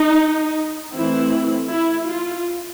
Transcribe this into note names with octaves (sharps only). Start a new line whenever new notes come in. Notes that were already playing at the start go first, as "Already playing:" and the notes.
Already playing: D#4
E3 A3 C4 E4
E4
F4